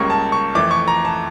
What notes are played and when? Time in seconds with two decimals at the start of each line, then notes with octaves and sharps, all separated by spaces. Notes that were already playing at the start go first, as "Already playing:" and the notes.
Already playing: C#2 C#3 G3 A#3 C#6
0.10 A5
0.32 C#6
0.55 F2 E3 A3 D6
0.71 C#6
0.88 A#5
1.05 A5